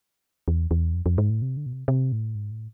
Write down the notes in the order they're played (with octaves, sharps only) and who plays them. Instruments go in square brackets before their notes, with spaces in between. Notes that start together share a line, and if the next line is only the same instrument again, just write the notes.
[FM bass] E2
E2
F2
F2
G#2
A2
C3
D3
B2
C3
C3
A2
G#2
A2